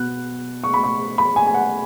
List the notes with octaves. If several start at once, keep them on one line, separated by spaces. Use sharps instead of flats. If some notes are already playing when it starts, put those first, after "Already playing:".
Already playing: B2 B3 F#6
C#6
B5
C#6
B5
G#5
G#5
F#5